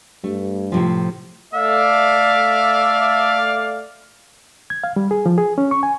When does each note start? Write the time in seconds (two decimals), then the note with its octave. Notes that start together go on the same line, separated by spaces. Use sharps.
0.24 G2 A3
0.72 A2 C3 F3
1.54 A3 D5 E5 F5
4.70 G#6
4.84 F5
4.96 G3
5.11 G#4
5.26 F3
5.38 G#4
5.58 C#4
5.71 C#6
5.83 G#5